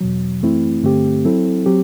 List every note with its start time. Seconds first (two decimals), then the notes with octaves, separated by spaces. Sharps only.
0.01 E2 B2 F#3
0.42 F#2 E3 A3 C4 E4
0.83 G2 D3 A3 C4 G4
1.25 F#3 C4 E4 A4
1.66 F#3 C4 G4